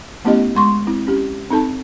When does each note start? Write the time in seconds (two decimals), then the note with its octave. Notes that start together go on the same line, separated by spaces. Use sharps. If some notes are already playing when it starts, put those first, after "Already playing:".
0.25 A3 B3 C#4 E4 G4 D#5
0.55 G#3 C6 C#6
0.87 C4 E4
1.07 C#4 G4
1.50 C4 D#4 A4 A5